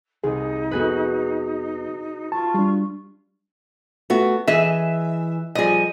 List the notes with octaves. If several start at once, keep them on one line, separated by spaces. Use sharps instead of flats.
C2 D#4 G#4
F2 B3 F#4 G#4 B4
F4 A5 C#6
G3 D4
A3 B3 F#4
E3 G#4 D#5 E5
F3 G3 G#4 D#5